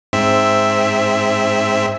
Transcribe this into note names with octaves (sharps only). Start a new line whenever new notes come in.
G#2 C4 E5